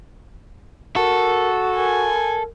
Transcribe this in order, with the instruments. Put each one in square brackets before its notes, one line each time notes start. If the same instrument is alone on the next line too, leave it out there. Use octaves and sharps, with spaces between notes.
[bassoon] F#4 [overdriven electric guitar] A4 [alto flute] A#4
[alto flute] A#4 [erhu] G#5